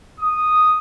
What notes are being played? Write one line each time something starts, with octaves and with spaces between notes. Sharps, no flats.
D#6